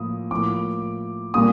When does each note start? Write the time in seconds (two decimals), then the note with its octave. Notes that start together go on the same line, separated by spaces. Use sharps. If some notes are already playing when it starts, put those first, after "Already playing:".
Already playing: A2 F3 A#3 D#6
0.31 A2 F3 A#3 D6
1.34 A#2 G3 A#3 D#6